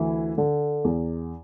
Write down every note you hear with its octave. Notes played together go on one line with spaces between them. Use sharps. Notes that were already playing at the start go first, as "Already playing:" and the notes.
Already playing: D2 E3 E4
D3
E2